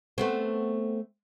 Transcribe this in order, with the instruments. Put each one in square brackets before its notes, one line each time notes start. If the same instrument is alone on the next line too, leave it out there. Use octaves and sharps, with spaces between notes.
[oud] A3 B3 C4